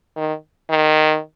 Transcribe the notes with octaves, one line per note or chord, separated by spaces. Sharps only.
D#3
D#3